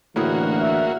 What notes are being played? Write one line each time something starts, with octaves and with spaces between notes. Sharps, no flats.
A1 D2 A2 A#3 E4 F#4 G#4
E5